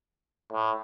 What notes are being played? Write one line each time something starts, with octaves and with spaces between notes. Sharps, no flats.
A2